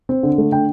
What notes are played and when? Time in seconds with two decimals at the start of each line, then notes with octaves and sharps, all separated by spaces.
0.09 C4
0.23 D3
0.38 A3
0.52 D3 G5